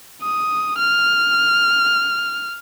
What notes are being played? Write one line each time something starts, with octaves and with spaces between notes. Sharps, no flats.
D#6
F6